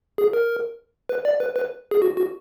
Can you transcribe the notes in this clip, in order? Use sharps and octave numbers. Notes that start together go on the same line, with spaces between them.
G#4
A#4
B4
D5
B4
B4
G#4
F#4
F#4